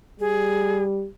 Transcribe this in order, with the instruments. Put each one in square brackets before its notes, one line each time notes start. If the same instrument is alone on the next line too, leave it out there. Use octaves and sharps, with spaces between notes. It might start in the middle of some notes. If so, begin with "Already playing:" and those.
[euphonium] G3 [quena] G#4